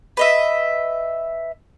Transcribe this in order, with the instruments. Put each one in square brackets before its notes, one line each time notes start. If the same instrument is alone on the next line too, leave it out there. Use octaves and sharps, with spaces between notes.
[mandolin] B4 D#5 E5